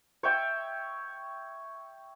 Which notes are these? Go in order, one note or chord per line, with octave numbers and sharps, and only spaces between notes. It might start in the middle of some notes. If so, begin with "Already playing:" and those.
C#5 E5 G5